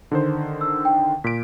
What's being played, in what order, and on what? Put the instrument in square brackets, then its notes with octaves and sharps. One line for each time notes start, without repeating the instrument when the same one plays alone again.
[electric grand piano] D3 D#3 C5
[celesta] E6
G5
[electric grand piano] A#2 D7 [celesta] B6